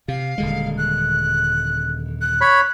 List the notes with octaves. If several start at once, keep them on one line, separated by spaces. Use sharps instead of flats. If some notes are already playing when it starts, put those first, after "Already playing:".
C3 F5
D#1 D3 G#3
F#6
F#6
C#5 B5